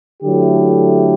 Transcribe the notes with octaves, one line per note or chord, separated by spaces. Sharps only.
D3 F#3 A3 E4 G4